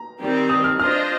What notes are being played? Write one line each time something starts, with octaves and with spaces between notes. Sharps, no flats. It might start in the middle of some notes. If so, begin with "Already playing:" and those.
Already playing: A#5
D#3 G3 C4 G4
D#6
F6
D4 F4 C5 D#5 F6